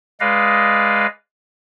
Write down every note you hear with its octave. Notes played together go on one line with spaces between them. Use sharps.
G#3 B4 D5 D#5 F5